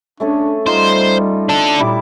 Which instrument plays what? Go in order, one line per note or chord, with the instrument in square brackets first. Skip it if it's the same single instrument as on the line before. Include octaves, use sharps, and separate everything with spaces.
[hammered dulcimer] A3 C#4 G#4 [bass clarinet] D4
[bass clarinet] G3 [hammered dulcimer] D#4 F4 [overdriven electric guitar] C5
[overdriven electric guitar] D4 A4
[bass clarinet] A#2 [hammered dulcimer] G3 E4 D6